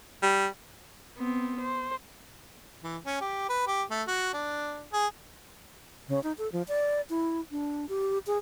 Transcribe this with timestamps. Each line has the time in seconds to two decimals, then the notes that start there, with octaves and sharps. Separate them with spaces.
0.22 G3
1.17 B3 C4
1.60 C5
2.83 E3
3.05 C#4
3.21 G4
3.49 B4
3.67 G4
3.90 A3
4.07 F#4
4.34 D4
4.93 G#4
6.08 C#3
6.23 D#4
6.38 A4
6.52 F3
6.68 D5
7.10 E4
7.51 D4
7.89 G4
8.27 G#4